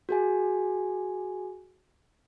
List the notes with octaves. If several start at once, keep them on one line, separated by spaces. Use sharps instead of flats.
F#4 G#4 G#5